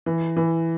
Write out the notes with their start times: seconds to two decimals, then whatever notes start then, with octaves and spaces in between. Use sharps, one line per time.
0.06 E3
0.37 E3